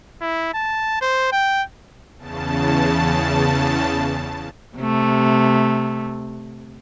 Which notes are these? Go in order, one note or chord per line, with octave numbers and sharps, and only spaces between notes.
E4
A5
C5
G5
E2 C#3 A5
C3 A3